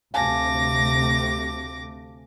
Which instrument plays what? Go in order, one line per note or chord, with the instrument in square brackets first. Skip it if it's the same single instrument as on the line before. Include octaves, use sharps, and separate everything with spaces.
[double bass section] D2 C3 A3 [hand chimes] F5 G#5 A5 [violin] D6 A#6